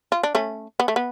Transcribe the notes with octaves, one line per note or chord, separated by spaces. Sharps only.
F4
D4
A3 C#4
B3
A3
B3